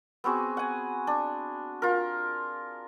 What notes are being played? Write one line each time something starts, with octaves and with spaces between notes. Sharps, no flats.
B3 C4 F#4 G#4
F#5 G#5
D4
F4 A#4